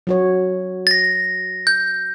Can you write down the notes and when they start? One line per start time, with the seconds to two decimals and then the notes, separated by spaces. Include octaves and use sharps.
0.07 F#3 F#4 C#5
0.87 A6 A#6
1.67 G6